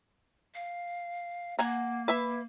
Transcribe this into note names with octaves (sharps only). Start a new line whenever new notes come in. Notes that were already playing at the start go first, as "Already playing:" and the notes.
F5
A#3 F#5 G#5 A#5
B4 E5 B5